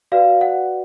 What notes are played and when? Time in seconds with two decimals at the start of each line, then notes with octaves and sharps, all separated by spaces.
0.12 F#4 B4 D5 F5
0.41 F#5